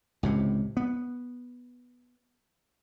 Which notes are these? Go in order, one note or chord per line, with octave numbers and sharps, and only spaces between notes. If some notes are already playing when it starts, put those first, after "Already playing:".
C#2 A2 C3
B3